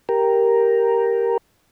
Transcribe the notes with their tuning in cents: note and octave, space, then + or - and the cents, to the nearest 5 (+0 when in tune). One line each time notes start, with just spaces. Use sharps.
G4 +0 A#4 +0